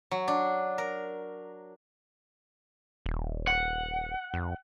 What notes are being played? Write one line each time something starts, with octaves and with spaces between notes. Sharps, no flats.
F#3
D4
A#4
D#1
F#5
F2